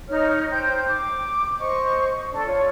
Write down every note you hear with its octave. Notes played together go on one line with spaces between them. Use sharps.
D#4 C#5 F6
C5 G5 G6
D6
C5 D#5 C#6
D4 A4 D5
F4 C#5